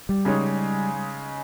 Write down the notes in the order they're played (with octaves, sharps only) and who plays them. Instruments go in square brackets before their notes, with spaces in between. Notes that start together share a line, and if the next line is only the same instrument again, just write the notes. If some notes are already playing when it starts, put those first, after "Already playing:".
[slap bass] G3
[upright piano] C#3 G#3 D#4 G#4 C#5